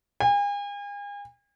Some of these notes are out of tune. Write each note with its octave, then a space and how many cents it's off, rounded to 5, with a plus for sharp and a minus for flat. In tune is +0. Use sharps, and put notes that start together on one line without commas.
G#5 -40